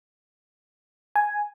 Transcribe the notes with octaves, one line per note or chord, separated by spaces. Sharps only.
G#5